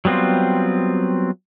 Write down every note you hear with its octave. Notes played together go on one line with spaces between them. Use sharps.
F#3 G3 B3 C4 F4